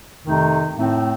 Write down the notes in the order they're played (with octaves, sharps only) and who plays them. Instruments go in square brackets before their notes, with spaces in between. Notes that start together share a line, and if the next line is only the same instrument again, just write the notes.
[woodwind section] F2 C3 D#3 A3 D#4
A2 A3 C4